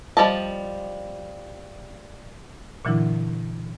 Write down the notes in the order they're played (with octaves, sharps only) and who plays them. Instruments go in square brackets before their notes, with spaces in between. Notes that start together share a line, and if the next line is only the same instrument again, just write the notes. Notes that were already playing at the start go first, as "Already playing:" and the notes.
[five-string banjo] F3 G3 D#5 A5
[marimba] A#2 D3 E3 F#3 D4 E4